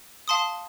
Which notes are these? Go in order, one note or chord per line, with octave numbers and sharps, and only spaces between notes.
F5 A5 C6 D#6